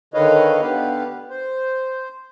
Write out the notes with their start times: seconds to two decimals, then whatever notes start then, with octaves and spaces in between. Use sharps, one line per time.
0.14 D3 D#3 B4 C#5 D#5 F5
0.61 D3 B3 G4 B4 F5
1.30 C5